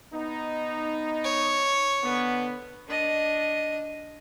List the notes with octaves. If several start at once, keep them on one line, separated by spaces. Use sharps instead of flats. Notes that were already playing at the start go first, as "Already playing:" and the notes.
B3 D#4
C#5
D3 B3
D4 D#5